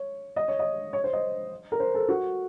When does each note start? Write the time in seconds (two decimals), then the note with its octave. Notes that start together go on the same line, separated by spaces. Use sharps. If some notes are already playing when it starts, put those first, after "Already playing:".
Already playing: C#5
0.36 D#5
0.48 C#5
0.59 D#5
0.93 C#5
1.04 C5
1.13 D#5
1.72 A#4
1.80 C5
1.94 A4
2.09 F#4